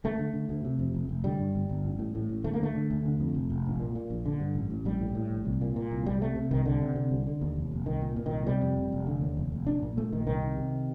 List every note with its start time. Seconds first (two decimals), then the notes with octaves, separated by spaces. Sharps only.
0.04 D2 A3
0.19 D3
0.34 D3
0.49 D2
0.65 C3
0.79 F2
0.94 F1
1.09 F1
1.24 D3 G3
1.39 G2
1.55 G1
1.69 G1
1.85 A1
1.99 A2
2.15 A2
2.29 A1
2.44 D2 A3
2.54 A#3
2.60 D3 A3
2.75 D3
2.91 D2
3.05 D3
3.20 F2
3.35 F1
3.50 F1
3.66 A#1
3.80 A#2
3.95 A#2
4.10 A#1
4.26 D3
4.40 G2
4.55 A1
4.70 A1
4.85 A#1 G3
5.01 A2
5.15 A2
5.31 A#1
5.45 C2
5.61 A#2
5.76 A#2
5.91 C2
6.06 C2 G3
6.21 C3 A3
6.36 C3
6.51 C2 D#3
6.65 C2 D3
6.82 C3
6.96 C3
7.11 C2
7.27 D3
7.41 D#2
7.56 F1
7.72 F1
7.86 C2 D#3
8.02 A#2
8.16 A#2
8.26 D#3
8.31 C2
8.47 C3 G3
8.62 F2
8.77 F1
8.92 F1
9.07 D3
9.21 D#2
9.37 F1
9.52 F1
9.67 A#1 D4
9.82 A#2
9.97 A#2 A3
10.13 A#1 D#3
10.26 C2 D#3
10.42 C3
10.58 C3